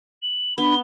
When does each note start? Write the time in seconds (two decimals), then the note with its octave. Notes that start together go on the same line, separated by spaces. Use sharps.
0.22 F#7
0.58 B3 D4 B5 G7